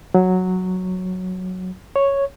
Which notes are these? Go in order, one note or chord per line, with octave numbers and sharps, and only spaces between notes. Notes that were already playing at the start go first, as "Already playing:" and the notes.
F#3
C#5